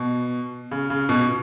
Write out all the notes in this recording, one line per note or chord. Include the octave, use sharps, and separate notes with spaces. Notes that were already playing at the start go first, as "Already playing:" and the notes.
Already playing: B2
C#3
C#3
B2